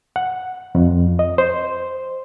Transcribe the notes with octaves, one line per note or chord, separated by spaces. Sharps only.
F#5
F2
D#5
C5